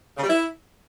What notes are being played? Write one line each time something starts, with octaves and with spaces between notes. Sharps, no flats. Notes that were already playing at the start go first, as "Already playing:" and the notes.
C#3
G3
E4